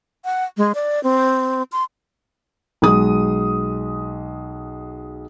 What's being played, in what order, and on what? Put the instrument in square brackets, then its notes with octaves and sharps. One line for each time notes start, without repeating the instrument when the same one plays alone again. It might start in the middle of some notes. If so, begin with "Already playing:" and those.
[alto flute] F#5
G#3
D5
C4
C6
[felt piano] B1 G#3 D#6